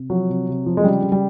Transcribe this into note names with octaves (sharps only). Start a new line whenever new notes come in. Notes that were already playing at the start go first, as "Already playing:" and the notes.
Already playing: C3
F3 F#3
C3
C3
F3
G#3
C#3 G3
C#3
G3